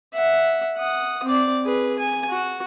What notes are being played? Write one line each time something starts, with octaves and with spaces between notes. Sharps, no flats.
E5 F#5
F#5 D#6
C4 D5
G#4 B4
G#5
F#4